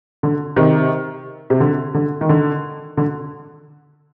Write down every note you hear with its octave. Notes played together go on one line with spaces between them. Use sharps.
D3
C3 D#3
C3
D3
D3
D#3
D3
D3